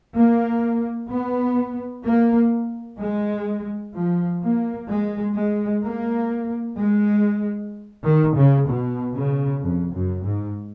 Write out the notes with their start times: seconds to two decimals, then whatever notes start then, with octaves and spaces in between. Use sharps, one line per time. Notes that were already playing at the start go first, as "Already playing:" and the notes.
0.15 A#3
1.09 B3
2.04 A#3
2.99 G#3
3.94 F3
4.41 A#3
4.89 G#3
5.35 G#3
5.83 A#3
6.77 G#3
8.03 D#3
8.35 C#3
8.67 B2
9.14 C#3
9.61 F2
9.94 F#2
10.24 G#2